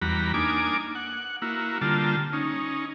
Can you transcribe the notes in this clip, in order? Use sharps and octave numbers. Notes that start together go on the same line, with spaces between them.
E2 G3 F#4 A#5 B5
A#3 D4 D#4 G#5 D6
F#5
A#3 E4 F#4
D3 G3 A#3 F4 A5
C#4 D#4